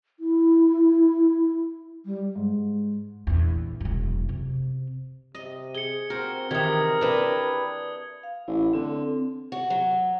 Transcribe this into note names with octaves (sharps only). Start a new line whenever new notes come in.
E4
G3
G#2
A#1 E2
E1 F#2
C3
C3 D#5
G#4 C#7 G7
C4 F#4 A#4 C5
C3 D#3 E3 A#4 D#6 G#6
D4 E4 G4 B4
F5
A1 E4
D3 C4
F#4
F#3